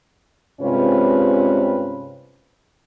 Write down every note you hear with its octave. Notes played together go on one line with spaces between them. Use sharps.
G2 C3 G#3 C#4 F4 B4